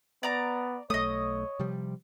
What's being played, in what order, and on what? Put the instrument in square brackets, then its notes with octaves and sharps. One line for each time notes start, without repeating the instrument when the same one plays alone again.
[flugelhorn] B3 [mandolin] D5 A#5 D6
[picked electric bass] B1 A3 [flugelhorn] C#5 [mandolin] D#5 D#6
[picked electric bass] C3 F3 G3